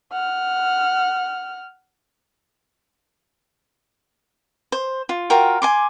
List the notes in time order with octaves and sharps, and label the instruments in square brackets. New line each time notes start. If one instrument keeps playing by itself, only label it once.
[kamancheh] F#5 F6
[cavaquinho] C5
F4
F4 F#4 A#4 G5
G#5 C6 D6